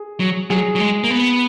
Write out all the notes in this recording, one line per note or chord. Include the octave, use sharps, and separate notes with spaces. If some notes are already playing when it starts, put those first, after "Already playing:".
Already playing: G#4
F#3
F#3 G#4
F#3
G#3
A#3
B3